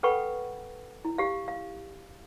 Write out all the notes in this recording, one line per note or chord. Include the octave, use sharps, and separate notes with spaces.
A4 B4 F#5 G5 B5 C#6
E4
G4 F5
F5